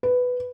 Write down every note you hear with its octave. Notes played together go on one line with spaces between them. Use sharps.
B4